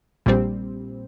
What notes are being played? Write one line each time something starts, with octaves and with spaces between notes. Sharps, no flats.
A#1 A#2 G3 C4